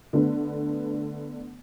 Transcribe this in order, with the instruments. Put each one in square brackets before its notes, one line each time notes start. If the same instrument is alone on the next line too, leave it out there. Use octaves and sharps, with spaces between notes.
[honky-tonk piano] D3 A3 B3